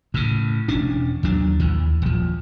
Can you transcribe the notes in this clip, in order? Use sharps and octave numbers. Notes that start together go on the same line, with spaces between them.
A2 C#3
E1 C#4 D4
D#2 F#3 D4
D#2 E3
D#1 F3